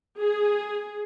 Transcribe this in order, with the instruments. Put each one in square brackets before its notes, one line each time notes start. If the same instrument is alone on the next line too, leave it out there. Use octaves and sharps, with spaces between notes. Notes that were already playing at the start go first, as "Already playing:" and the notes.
[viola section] G#4